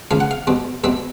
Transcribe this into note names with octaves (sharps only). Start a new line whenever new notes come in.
C#2 C#3 F3 F5
F#5
F5
B2 G3 C4
B2 G3 C4 E5